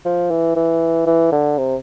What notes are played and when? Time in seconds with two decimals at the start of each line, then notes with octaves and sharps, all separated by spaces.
0.05 F3
0.30 E3
0.56 E3
1.06 E3
1.32 D3
1.58 C3